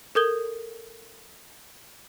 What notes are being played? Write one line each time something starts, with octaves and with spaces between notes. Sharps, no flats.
A4 A#4 D#6 G6 G#6 G7